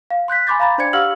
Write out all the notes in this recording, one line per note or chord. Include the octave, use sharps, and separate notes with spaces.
F5
C6 F#6 G6 B6
G#5 B5 C6 D6 G6 A6
F5 A#5 B5 A6
D4 C5 D5 G#6 C#7
G4 F5 F#5 E6 F6 F#7